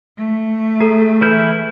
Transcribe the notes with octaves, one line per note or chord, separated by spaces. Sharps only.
A3
G#4 A4 A#5
E3 E4 B4 G6